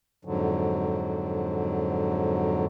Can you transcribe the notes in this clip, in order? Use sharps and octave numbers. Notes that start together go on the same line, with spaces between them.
F2 G#2 D3 F#3